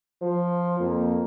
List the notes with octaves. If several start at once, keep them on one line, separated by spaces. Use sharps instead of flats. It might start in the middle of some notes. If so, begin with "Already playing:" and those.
F3 C5
F2 A#3